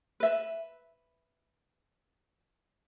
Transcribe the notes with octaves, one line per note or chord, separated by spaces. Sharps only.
B4 E5